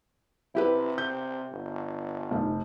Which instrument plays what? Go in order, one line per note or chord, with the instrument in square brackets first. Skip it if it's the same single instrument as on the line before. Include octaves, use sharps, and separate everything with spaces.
[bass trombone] C3 [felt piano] E4 G4 B4
[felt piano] G6
[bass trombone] G1
[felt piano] F1 D#3